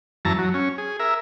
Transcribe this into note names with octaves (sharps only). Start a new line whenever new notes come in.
F#2 E3 A5 A#5
F#3
C#4
G#4
A#4 E5